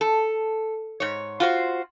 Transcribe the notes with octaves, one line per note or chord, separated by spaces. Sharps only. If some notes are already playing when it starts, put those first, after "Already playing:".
A4
G#2 C#5
F4 F#4 C5